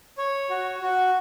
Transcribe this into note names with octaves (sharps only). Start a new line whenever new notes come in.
C#5
F#4
F#4